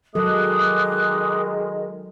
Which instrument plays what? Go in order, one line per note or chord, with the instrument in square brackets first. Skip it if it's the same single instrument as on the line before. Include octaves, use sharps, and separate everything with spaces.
[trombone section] D#3 G#3 [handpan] F#3 A4 [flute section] D6 D#6 F#6